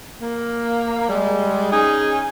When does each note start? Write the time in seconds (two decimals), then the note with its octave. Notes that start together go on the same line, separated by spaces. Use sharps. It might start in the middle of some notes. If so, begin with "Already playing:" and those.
0.20 A#3
1.09 G3 G#3
1.72 C#4 D#4 G#4